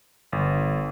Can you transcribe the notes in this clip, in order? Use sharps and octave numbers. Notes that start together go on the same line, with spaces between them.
G1